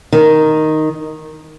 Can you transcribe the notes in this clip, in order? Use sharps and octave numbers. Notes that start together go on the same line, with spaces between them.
D#3